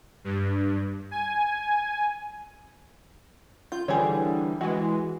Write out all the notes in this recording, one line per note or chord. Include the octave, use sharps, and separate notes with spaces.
G2
G#5
F4 G6
D3 E3 G3 G#4 C5 C#5
E3 G#3 F#4